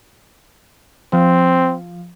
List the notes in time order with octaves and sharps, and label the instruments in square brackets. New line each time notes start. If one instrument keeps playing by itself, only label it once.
[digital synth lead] F3 [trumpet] C4